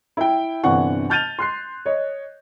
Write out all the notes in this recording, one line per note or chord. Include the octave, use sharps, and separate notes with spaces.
E4 G5
G1 C3 E3 D4 F#5 C#6
A5 F6 G6 A6 D#7 F7
C6 F#6 C7
C#5 D#5